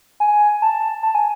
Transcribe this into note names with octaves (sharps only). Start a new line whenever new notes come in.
G#5
A5
A5
G#5